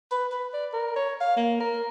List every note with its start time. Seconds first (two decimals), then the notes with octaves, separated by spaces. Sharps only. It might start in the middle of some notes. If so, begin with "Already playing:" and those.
0.11 B4
0.32 B4
0.54 D5
0.73 A#4
0.96 C#5
1.20 F5
1.36 A#3
1.60 A#4